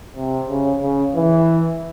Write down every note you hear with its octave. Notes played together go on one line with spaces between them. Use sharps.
C3
C#3
C#3
E3